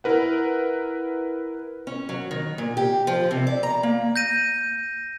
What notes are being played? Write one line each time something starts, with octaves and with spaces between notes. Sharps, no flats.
E4 A#4 B4 F#5
C#4
F#3
D#3
A#2
G4
F3
C3
D5
A#5
A#3
G6 A#6 D#7